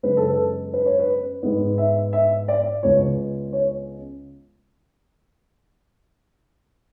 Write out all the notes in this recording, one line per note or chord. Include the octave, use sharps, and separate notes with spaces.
F#2 C#3 G#3 B3 B4
A4
B4
B4
C#5
B4
G#2 G#3 B3
E5
E5
D5
C#2 C#3 G#3 B3 C#5
C#5